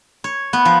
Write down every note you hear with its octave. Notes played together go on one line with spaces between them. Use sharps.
C#5
B3
F3